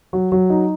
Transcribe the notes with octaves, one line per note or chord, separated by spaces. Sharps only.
F#3
F#3
D#4